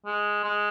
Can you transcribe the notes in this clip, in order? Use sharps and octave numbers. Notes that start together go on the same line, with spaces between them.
G#3
G#3